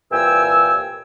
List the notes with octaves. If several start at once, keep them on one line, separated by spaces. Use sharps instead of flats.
C2 A#2 E3 G5 G#5 E6